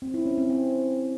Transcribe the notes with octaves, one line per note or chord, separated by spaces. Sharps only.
C4
E4
C#4
C4
C4